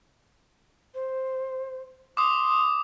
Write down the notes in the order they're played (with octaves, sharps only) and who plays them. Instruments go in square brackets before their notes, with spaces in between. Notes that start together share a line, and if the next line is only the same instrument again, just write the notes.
[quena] C5
[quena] C6 [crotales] D6 D#6